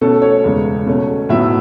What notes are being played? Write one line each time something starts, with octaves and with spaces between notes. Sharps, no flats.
B2 A3 C#4 A4
C#5
E2 C#3 G#3
B2 A3 C#4
A2 F#3 B3 E4 E5